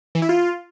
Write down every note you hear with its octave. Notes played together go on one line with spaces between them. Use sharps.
E3
E4
F4